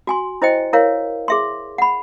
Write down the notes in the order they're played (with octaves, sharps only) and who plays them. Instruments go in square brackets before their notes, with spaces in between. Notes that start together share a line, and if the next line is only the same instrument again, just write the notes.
[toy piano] F#4 G#5 C6
E4 C5 D#5 G5
E4 A#4 C#5 F5
G#4 E5 C6
F#5 B5